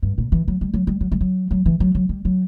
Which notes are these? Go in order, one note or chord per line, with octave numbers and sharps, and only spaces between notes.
G2
A#2
E3
F#3
G3
F#3
G3
F#3
G3
F#3
F#3
E3
F#3
F#3
G3
F#3